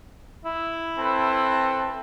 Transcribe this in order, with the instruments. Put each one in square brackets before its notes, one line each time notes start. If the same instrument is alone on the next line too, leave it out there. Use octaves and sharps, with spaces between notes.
[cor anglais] E4
[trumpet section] C4 A4 B4